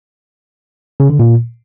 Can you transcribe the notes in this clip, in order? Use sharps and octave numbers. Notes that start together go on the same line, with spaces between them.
C#3
D3
A#2